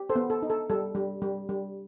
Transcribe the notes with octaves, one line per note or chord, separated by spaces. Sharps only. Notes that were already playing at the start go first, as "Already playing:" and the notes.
Already playing: G4
A4 C5
B3
A4
D#4
A4
G3 A4
G3
G3
G3